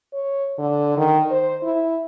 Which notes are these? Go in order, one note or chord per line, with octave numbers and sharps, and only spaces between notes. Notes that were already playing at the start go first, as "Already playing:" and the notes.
C#5
D3
D#3
C5
E4